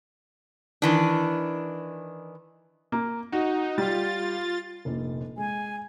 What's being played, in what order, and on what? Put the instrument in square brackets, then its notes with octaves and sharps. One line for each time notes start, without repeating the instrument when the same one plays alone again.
[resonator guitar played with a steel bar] D#3 E3 D4
[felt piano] A#3
[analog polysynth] D#4 [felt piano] F#4
[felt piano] G3 [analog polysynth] F4 A6
[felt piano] F1 A#1 A#2
[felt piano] G#3 [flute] G#5